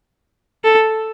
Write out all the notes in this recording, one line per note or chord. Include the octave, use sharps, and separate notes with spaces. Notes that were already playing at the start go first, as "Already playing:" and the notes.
A4